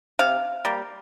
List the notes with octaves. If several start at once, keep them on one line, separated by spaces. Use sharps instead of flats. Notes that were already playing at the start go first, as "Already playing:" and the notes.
C3 F5
G3 A#3